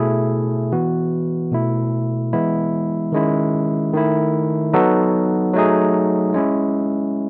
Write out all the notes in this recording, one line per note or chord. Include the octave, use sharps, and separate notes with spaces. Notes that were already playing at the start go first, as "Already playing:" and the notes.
Already playing: B2 A3 E4 G#4
E3 B3 F#4
B2 A3 E4
E3 G#3 B3 E4
D#3 G#3 C#4 E4
D#3 A3 E4
F#3 B3 D#4 F#4 A4
F#3 A3 D#4 G#4
G#3 C#4 E4